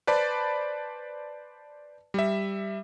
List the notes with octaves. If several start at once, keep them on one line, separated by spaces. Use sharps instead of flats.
B4 C5 D5 A5 B5
G3 E5